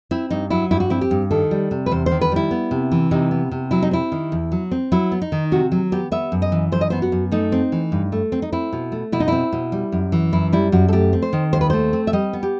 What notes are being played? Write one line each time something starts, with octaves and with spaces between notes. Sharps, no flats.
C4 E4
G2 D#4
F#3 E4
G2 E4
F#4
C4 E4
G4
G2
D#3 A4
G3
C3
B4
E2 C5
D#3 C5
B4
G3 E4
B3
C3
E3
C3 D#4
B3
C3
F#3 E4
D#4
C4 E4
D#3
E2
F#3
C4
F#3 E4
B3
D#4
D#3
C3 F#4
F#3
B3 G4
B3 E5
F#2
D#5
E3
F#2 C5
D#5
B3 C5
F#4
F#2
A3 D#4
C4
E3
G2
A3
C4
D#4
C4 E4
B2
A3
B2 E4
D#4
C4 E4
B2
G3
F#2
E3
F#2 E4
G3 E4
F#2 F#4
A4
A3 G4
C4
C5
D#3
D#2 C5
B4
A3 C5
C4
E5
G3 D#5
B3
G4